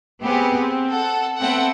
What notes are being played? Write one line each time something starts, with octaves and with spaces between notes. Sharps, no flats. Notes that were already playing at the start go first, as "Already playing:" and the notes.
B3 C4 G4 G#4
C4
A4 F#5
B3 C4 A4 E5 F#5 G5